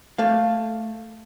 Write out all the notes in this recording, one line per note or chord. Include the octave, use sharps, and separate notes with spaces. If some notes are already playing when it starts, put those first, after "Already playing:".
A3 F5